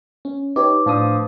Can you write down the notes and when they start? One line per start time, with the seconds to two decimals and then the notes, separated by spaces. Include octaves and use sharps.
0.25 C#4
0.56 D#4 G4 B4 C#5 D6
0.86 A2 F3 D4 D#6